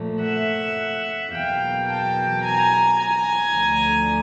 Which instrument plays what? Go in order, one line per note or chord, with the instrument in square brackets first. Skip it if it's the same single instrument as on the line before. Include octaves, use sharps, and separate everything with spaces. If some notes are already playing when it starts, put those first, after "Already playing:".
Already playing: [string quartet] A#2 F3 A3
E5 F#5
E2 B2 F#3 A#3 F5 G5
G5 A5
G#5 A#5
G#5 A#5
D2 D3 F3